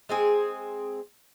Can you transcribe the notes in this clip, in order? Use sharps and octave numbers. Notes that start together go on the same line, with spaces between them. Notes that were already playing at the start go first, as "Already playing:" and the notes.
G#3 C4 G#4